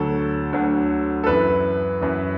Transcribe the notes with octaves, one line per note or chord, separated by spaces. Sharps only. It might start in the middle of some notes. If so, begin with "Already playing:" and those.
Already playing: D2 D3 F#3 A4
D2 D3 F#3
A4
F#2 E3 B4
F#2 E3